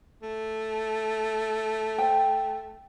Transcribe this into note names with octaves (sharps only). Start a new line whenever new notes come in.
A3
C5 G5